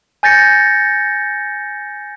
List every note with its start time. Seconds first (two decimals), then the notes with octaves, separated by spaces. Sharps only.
0.23 G#5 G6 A6 A#6 C#7